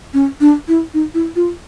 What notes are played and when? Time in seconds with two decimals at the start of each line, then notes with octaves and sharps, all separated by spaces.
0.14 C#4
0.41 D4
0.68 E4
0.94 D#4
1.14 E4
1.36 F4